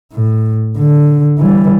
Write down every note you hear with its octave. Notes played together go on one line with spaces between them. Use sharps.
A2
D3
E3 G3